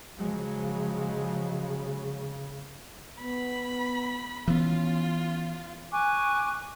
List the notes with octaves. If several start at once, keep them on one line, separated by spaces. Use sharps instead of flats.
C#3 F3 F#3 G#3
B3 B5
E3 B3 C#4 F4
G#5 C#6 D6 F#6